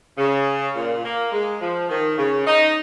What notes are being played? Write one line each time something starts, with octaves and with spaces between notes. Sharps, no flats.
C#3
A#2
A#3
G#3
F3
D#3
C#3
D#4